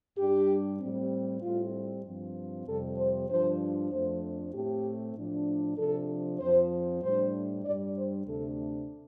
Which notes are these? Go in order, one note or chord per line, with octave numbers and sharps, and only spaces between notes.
G2 G3 D4 G4
A2 G3 C4
A2 G3 C4 F4
G2 F3 C4
F2 C3 G3 C4 A4
C5
G2 F3 D4 C5
F2 F3 A3 D4 C5
A2 A3 C4 G4
A2 F3 D4
C3 F3 D4 A4
F2 F3 C4 C5
A2 G3 D4 C5
G2 G3 D4 D5
C5
D2 C3 A3 D4 A4